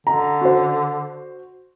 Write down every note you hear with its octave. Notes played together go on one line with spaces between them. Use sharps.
D3 A#5
F#4 C5